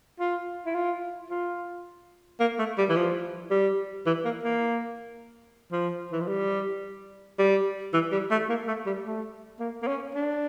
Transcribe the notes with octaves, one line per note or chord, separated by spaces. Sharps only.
F4
E4
F4
F4
A#3
A3
G3
E3
F3
G3
E3
A#3
A#3
F3
E3
F3
G3
G3
E3
G3
A3
A#3
A3
G3
A3
A#3
A#3
C#4
D4